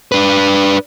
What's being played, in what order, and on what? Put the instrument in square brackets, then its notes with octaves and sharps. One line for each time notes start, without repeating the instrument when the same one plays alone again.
[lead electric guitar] D4 B4